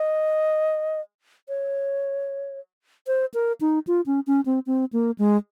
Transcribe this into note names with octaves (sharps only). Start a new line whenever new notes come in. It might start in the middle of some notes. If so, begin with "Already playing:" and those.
Already playing: D#5
C#5
C5
A#4
D#4
F4
C#4
C#4
C4
C4
A#3
G#3